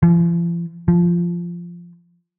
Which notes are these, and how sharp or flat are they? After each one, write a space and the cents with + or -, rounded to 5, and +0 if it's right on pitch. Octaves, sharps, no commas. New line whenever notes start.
F3 -45
F3 -10